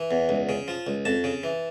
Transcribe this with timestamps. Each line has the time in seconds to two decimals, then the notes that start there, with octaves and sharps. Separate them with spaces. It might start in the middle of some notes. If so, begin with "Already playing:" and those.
Already playing: E3
0.11 E2
0.29 C#2
0.49 C#3
0.68 F3
0.87 C#2
1.05 F2 A5
1.24 C#3
1.43 E3